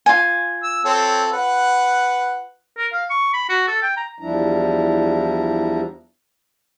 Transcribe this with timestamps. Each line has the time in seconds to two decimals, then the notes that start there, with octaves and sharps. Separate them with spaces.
0.06 F4 G#5
0.63 E6
0.85 C4 A4 C#5
1.32 B4 F#5
2.77 A#4
2.93 F5
3.10 C#6
3.34 B5
3.49 F#4
3.68 A4
3.83 G5
3.97 A#5
4.19 E2 F3 G3 D4 E4 A#5